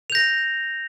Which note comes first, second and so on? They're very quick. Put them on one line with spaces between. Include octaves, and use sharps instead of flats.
F7 G6 A#6